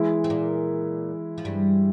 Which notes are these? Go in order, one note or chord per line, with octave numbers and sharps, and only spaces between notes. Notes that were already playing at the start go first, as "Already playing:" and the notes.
Already playing: E3 G#3 E4
C4
A#2 A#3
F3
G2 G3